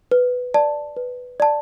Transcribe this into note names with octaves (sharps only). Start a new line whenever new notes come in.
B4
D5 A5
B4
D5 A5